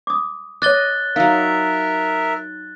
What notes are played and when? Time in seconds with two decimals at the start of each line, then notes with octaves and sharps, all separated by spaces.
0.07 D6 D#6
0.62 C#5 D#5 D6 F#6 A6 G7
1.16 F#3 D#4 A#4 E5 F5